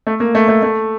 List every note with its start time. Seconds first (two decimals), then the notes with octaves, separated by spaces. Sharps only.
0.07 A3
0.20 A#3
0.35 A3
0.48 A3
0.63 A3